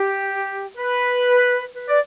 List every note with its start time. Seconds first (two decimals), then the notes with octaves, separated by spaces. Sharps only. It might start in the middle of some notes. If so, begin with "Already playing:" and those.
Already playing: G4
0.76 B4
1.75 B4
1.89 D5